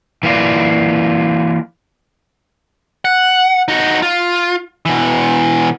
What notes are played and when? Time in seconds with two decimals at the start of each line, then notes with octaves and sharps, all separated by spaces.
0.23 E3 A#3 F4 D5
3.05 F#5
3.68 D#4 F#4
4.02 F4
4.86 B2 E3